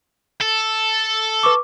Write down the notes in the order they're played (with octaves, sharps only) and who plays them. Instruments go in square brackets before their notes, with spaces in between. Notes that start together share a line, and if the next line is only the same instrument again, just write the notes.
[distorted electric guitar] A4
[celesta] B4 C#6 D6